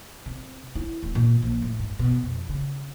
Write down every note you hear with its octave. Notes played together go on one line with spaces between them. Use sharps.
C3
E4
D1
A#2
A#1
A2
G2
B2
F2
C#3